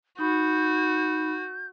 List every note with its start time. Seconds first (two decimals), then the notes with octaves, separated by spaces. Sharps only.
0.19 D#4 F#4 B5 G6